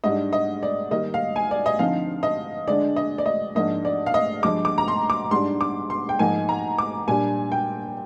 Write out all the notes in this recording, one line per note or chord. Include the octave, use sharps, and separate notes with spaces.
G#2 G3 D4 D#5
D#5
D5
D#3 G3 A#3 D#4 D#5
F5
G#5
D5
D#5
D3 F3 C4 D#4 F5
D#5
D3 G#3 D4 D5
D#5
D5
D#5
G#2 F3 A#3 D4 D#5
D5
F5
D#5
G2 F3 G#3 D6
D6
A#5
C6
D6
G#2 G3 D4 C6
D6
C6
G5
G#2 F3 A#3 D#4 G#5
A#5
D6
A#2 G3 D4 G#5
G5